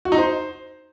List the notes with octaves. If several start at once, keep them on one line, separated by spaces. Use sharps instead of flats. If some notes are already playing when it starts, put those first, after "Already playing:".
F#4
D#4
C5